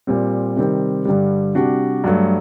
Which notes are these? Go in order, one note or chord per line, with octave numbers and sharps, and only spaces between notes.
A#2 G3 C4
C3 D#3 G3 C4
G2 D3 G3
C3 G3 D4 F#4
G2 F#3 A3